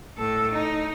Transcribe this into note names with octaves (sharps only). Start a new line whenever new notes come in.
A2 A4
D#4